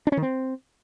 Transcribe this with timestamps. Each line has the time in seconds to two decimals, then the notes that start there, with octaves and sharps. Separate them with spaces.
0.07 D4
0.12 C#4
0.17 D#3
0.22 C4